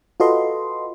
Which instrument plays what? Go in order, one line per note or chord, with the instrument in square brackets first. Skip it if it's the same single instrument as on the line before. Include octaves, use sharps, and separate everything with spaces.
[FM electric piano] F4 F#4 A4 B4 D#5 C6